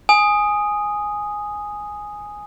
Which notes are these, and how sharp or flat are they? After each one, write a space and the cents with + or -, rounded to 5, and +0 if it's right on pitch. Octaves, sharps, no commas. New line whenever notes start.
G#5 +0 D#6 +0